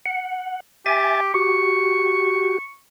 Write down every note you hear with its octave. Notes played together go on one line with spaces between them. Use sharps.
F#5
G4 E5 G#5 A6
F#4 G4 C#6